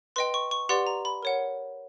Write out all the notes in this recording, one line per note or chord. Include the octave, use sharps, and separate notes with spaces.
B4 D#5 G5 C6
C#6
C#6
G4 B4 D5 F#5 C6
A#5
B5
A#4 C#5 F#5